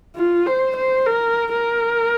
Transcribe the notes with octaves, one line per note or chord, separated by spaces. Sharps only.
F4
C5
C5
A#4
A#4